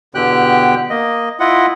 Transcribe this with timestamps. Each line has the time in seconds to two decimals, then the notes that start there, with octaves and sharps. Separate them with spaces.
0.15 E2 B2 D3 G4 G5 F#6
0.90 A#3 D#5
1.40 E4 F4 D#5 F#5